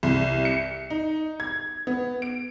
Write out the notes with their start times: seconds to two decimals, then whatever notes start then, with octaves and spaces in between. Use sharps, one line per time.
0.03 C2
0.45 C#7
0.90 D#4
1.40 G#6
1.87 B3
2.22 D7